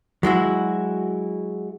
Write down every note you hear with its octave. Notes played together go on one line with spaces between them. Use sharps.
F#3 G#3 E4 F#4